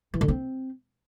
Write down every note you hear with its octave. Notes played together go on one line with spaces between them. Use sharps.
E3
D3
C4